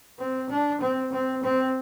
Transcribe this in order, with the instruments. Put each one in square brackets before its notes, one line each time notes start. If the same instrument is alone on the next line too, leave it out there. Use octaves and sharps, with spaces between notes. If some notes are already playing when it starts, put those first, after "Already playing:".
[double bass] C4
D4
C4
C4
C4